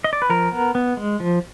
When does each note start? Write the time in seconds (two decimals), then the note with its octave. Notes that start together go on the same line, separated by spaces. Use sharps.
0.04 D#5
0.13 D5
0.22 B4
0.30 F3 A#4
0.52 B3
0.75 B3
0.97 G#3
1.20 F3